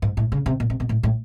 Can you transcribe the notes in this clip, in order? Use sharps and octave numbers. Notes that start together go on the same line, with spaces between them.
G#2
A2
C#3
C3
A#2
C3
B2
A2
A2